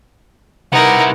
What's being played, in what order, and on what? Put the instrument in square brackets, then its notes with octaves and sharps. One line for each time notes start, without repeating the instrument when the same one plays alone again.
[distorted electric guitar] C3 E4 [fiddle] D#4 A#4 [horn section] B4 F#5